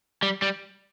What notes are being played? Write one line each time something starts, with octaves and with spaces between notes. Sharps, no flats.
G3
G3